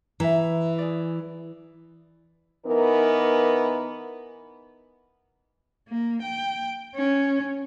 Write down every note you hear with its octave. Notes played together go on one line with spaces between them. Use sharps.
E3 E5 A#5
G#4 D5
E3 B3 D#4 A#4
A#3
G5
C#4